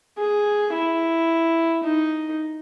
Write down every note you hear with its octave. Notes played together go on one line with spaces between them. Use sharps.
G#4
E4
D#4